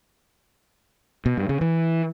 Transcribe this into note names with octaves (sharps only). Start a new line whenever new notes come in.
B2
G2
C#3
E3